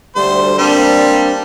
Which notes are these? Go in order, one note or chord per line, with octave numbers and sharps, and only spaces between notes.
D2 G3 C5
G3 A#3 C4 D4